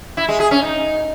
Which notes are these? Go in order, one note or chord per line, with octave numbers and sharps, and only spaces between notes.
E4
G#3
G#4
C#4
D#4